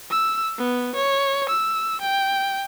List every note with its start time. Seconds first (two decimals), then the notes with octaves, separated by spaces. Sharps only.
0.10 E6
0.58 B3
0.96 C#5
1.49 E6
2.02 G5